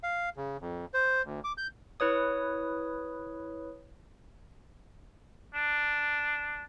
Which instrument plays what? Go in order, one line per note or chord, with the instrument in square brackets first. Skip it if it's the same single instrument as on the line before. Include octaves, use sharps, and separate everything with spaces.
[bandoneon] F5
C#3
F2
C5
D2
D6
G6
[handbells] E4 B4 C#5 D#6
[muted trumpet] D4